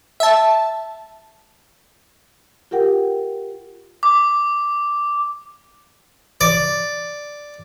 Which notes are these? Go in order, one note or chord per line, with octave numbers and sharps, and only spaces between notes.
E5 A5
F4 G4 A#4 F#5 G5
D6
D5